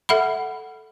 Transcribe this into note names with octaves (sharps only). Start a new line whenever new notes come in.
A4 E5 F#5 B5